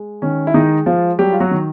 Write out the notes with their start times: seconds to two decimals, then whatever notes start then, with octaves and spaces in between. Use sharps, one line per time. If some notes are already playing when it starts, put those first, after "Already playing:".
Already playing: G#3
0.22 D#3 C#4
0.47 E4
0.54 D#3 G#3 D#4
0.86 F3 F4
1.19 F#3 G3 G4
1.33 F4
1.40 F#3 F#4
1.51 D#3